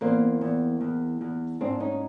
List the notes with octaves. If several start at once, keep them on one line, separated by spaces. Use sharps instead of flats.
E2 A#3 C4
E2
E2
E2
G#2 C4 D4
C#4 D#4